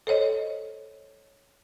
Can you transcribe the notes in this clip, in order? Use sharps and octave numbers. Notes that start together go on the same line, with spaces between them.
A4 C5 C#5 D#5